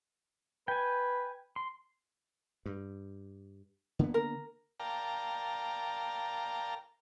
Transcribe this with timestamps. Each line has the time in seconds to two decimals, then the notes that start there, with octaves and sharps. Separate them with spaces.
0.68 B4 G5 G#5
1.56 C6
2.66 G2
3.99 D3 A#3 B3
4.14 A#4
4.80 A#4 D5 F5 G5 A5 A#5